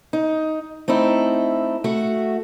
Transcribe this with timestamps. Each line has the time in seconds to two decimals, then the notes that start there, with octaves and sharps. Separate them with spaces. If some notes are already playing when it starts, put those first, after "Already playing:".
0.13 D#4
0.88 A3 C4 D#4 E4
1.84 A3 F#4